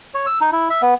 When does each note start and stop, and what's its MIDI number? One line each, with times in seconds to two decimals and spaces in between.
0.14 0.26 73
0.26 0.38 88
0.41 0.50 63
0.53 0.68 64
0.70 0.82 76
0.82 0.94 59